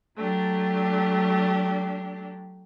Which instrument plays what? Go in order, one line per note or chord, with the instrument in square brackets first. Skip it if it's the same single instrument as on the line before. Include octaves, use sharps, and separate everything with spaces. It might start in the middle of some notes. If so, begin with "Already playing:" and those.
[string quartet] F#3 A3 D4 G4